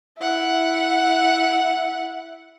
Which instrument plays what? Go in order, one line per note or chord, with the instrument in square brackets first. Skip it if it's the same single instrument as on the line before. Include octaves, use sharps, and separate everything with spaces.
[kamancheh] E4 F#5